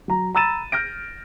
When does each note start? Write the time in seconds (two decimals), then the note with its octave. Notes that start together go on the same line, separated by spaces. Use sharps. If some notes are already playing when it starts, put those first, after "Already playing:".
0.08 F#3 A#5
0.35 A#5 B5 E6 A6 D#7 E7
0.72 F6 G6 A#6 D7